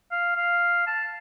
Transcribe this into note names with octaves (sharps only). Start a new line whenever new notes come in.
F5
F5
A5